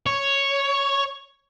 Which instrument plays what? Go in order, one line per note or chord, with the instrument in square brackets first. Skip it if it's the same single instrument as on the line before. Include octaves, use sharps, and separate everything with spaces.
[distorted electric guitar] C#5